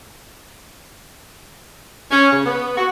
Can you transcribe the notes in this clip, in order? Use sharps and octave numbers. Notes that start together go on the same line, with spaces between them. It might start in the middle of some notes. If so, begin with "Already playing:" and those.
C#4
C#3
B3
F#4